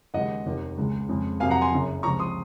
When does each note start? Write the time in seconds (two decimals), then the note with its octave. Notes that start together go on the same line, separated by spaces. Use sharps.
0.14 D#2 C#3 G#3 D#5 F#5
0.45 F1 D#2 D#3
0.77 C#2 C#3 G#3
1.09 F2 C#3 G#3
1.40 F2 C3 F#3 A#3 F5 G#5
1.50 F#5 A#5
1.61 G#5 C6
1.72 F#1 F#2 C#3
2.03 C#2 C3 F3 A#5 C#6
2.19 C6 D#6